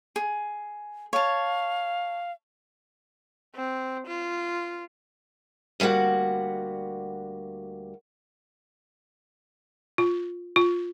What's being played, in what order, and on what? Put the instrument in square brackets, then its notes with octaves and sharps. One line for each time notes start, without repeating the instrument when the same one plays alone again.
[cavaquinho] G#4
[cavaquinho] C#5 A5 [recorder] F5
[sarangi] C4
F4
[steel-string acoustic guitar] D2 G3 A#3 F#4 F#5
[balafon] F4
F4